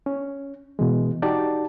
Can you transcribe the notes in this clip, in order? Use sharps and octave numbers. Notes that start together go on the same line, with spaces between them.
C#4
B2 E3 G#3
D#4 F#4 G4 D5 A5